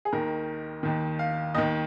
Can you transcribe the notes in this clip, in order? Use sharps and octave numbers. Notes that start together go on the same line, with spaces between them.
G#4
D#2 D#3 A#4
D#2 D#3
F5
D#2 D#3 D#5